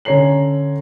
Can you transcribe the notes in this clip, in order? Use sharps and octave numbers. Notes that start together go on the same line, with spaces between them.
D3 C#4 C#5 A#5 C7 F#7